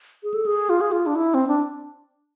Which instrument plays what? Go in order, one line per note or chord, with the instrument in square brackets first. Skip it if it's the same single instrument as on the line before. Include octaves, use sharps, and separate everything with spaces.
[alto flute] G#4
A4
G#4
F4
G#4
F4
D4
E4
C4
D4